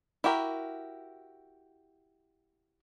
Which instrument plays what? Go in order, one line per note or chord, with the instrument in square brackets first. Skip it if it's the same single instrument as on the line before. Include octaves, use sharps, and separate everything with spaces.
[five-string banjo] E4 F#4 G4 A#4